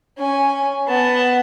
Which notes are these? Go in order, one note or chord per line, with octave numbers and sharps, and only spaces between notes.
C#4 G#5
B3 A5